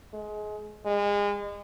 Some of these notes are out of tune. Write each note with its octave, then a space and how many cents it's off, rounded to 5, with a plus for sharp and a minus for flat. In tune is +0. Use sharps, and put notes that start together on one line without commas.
G#3 +25
G#3 -30